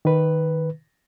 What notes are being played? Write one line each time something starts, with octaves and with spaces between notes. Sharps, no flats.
D#3 B4